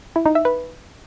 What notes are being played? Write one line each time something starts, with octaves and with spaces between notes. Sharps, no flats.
E4
D#4
E5
B4